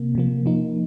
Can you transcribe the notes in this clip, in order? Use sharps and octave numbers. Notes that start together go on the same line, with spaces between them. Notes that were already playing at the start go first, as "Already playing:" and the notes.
Already playing: C3 A#3
C3 F3 A#3
F3 A#3 D#4